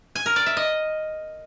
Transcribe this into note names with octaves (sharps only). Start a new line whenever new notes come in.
G#5
A#4
D5
E5
D#5